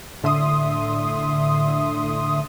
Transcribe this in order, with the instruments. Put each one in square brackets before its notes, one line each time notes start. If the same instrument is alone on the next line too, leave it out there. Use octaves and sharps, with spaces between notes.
[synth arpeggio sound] A2 D3 E5 C6 D#6